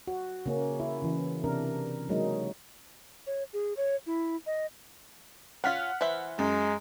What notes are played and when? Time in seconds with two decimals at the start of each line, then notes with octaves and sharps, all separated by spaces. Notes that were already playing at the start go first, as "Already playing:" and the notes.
0.07 F#4
0.46 C#3 A#3 C#4
0.80 E4
1.02 C#3 E3
1.44 C3 D4 A#4
2.09 F#3 G#3 A#3 D#4
3.27 C#5
3.53 G#4
3.77 C#5
4.07 E4
4.46 D#5
5.64 C#4 F4 F#5 F6 B6
6.01 E3 C5 E5
6.39 F#2 G#3